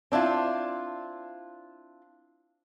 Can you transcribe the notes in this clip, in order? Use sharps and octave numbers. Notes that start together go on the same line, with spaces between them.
C4 D4 E4 F4